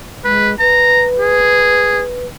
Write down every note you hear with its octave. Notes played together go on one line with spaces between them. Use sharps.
G#3 B4
B4 A#5
G#4